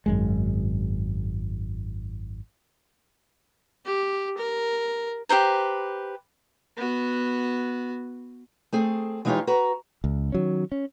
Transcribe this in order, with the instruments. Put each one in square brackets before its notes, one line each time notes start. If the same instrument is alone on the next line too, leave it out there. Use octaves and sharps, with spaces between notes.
[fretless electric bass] G#1 F#2 G#3
[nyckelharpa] G4
A#4
[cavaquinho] G4 B4 C5 A#5
[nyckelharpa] B3 F#4
[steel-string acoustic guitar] A3 C4 G#4
E3 G#3 D#4 F4 G4 C#5
F#4 B4 A#5
[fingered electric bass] C#2
D#3 F#3 C#4
C#4